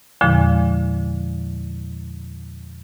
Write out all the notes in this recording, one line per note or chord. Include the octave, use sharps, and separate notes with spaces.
E2 A#2 D3 F3 G#3